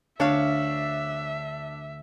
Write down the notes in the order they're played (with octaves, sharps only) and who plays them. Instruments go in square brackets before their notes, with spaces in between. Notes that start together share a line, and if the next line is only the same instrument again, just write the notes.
[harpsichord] D2 [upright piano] D4 [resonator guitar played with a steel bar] C#5 F5 [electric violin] E5